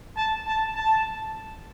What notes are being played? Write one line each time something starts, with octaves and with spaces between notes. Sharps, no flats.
A5
A5
A5